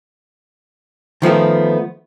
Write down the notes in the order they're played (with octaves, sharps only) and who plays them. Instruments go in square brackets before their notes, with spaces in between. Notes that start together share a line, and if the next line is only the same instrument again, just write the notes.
[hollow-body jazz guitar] D#3 F3 A3 B3